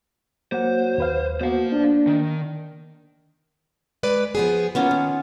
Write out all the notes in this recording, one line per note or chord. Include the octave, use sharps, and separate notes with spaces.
F#3 A#3 C5 F#5
D#2 B4 F5
A#3 B3 F#4 C5 F5
D4
D#3
G#3 B4 D5
F3 B3 G#4
A#3 B3 C#4 F4
D#3